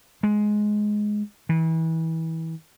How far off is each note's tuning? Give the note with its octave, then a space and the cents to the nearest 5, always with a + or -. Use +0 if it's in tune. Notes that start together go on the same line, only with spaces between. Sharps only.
G#3 +10
E3 -30